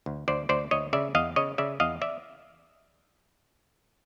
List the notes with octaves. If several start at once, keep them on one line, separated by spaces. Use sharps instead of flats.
D2
D2 C5 D5
D2 C5 D5
D2 C#5 D#5
C#3 D5 E5
E2 D#5 F5
C#3 C#5 D#5
C#3 D5 E5
E2 D#5 F5
D5 E5